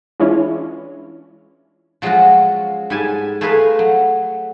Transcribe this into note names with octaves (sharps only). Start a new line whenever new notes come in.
E3 G#3 C#4 D4 E4 F4
F3 F#3 G#3 C#4 F4 F#4
G#2 G3 G#5 A5
A3 F4 G#4 A#4 B4 F5
F#3